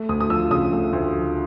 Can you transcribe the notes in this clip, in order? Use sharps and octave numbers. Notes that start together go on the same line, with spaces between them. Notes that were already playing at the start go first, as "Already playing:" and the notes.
Already playing: A3
D2 D#6
D#6
F3 E6
C#3 D#6
A3
D2
F3